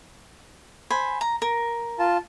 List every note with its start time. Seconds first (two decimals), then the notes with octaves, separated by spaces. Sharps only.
0.90 C5 G#5 B5
1.21 A#5
1.42 A#4
1.99 F4 A5